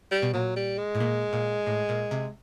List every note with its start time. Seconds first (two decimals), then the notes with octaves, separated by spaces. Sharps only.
0.11 G3
0.22 B2
0.34 A#2 F#3
0.56 G3
0.78 G#3
0.95 A2
1.00 A#2
1.33 A#2
1.66 A2
1.89 A#2
2.11 C3